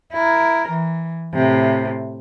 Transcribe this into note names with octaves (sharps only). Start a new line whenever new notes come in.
E4 A#4
E3
A2 C3